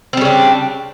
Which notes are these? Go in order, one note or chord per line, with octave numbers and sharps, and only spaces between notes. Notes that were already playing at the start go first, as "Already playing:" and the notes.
C#3 G3 C4 D4